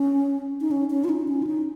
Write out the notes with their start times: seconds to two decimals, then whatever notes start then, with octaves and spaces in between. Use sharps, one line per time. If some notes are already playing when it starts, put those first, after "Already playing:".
Already playing: C#4
0.61 D#4
0.71 C#4
0.91 C#4
1.04 F4
1.09 D#4
1.28 C#4
1.43 F4
1.47 D#4